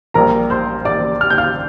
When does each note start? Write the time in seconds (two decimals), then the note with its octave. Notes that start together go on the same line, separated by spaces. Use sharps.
0.14 A#1 A#2 G3 A#4 A#5
0.50 C5 C6
0.85 D5 D6
1.21 F6
1.30 G6
1.38 F5 F6